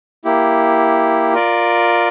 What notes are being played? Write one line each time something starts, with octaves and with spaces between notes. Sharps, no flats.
A#3 E4 G4
F4 A#4 D5